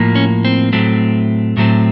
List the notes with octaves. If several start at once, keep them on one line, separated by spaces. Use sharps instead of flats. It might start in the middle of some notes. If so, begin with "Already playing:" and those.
Already playing: A2 F3 A#3
C#4
C4
A2 F#3 A3 C4
A2 F#3 A3 C4